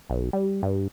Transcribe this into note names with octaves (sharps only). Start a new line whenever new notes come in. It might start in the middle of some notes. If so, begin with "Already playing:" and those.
B1
G3
G2